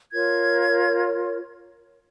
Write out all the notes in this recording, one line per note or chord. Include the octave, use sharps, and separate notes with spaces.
F4 A#4 C#5 G#6